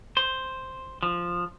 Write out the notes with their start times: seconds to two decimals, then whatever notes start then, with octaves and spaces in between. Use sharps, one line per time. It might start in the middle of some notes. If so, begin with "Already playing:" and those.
0.17 C5
1.02 F3